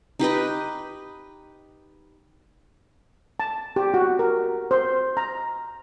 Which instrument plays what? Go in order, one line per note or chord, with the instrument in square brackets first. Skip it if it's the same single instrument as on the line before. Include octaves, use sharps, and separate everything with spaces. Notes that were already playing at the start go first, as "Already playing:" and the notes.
[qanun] D#4 G4 B4 D#5
[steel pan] A5
G4
F#4
A#4
C5
A#5